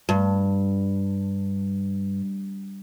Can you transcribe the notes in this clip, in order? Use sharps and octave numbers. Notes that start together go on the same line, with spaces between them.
G2